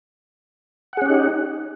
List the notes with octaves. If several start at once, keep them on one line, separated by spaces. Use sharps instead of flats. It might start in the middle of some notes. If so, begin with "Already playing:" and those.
C#4 D#4 G4 G#4 F#5